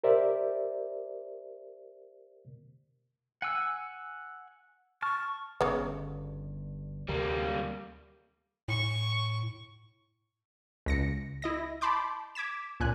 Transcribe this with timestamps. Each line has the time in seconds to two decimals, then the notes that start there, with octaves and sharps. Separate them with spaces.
0.04 G4 A#4 C5 D5 E5
3.42 F#5 G#5 E6
5.02 A5 C#6 F6
5.61 G1 G2 C#3 B3 B4 C#6
7.09 D2 C3 F#3 G3 A#3
8.68 A2 C#6
10.86 C#2 A#6 C#7
11.42 E4 D#5 A#6
11.81 A5 B5 C6 D6 G6
12.35 D6 G#6 B6 E7
12.80 C#2 A#2 G#5 F#6